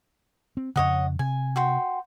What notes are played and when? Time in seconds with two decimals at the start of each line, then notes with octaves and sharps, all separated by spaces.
0.57 C4
0.76 F2 C#3 C#5 D#5 F#5
1.19 C3 G#5
1.56 F#4 G5 C6